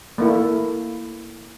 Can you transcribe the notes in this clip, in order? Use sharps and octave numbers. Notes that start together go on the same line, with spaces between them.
A3 A#3 E4